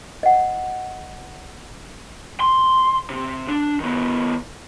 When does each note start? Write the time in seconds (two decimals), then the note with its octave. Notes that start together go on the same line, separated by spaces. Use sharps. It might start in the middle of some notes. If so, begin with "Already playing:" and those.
0.23 D#5 F#5
2.40 C6
3.10 C3 C4
3.48 D4
3.80 D#3 B3